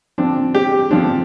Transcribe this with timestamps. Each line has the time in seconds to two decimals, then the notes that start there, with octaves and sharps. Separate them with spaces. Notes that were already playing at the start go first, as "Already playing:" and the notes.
0.18 D3 F3 C4 D4
0.55 G4
0.91 D3 F3 C4 D4